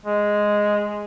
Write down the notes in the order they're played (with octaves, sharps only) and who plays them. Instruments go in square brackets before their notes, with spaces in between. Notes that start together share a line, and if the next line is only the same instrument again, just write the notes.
[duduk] G#3